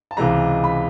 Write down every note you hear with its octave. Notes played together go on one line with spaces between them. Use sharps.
A5
C#2 C3 E3 G#3 A#5
B5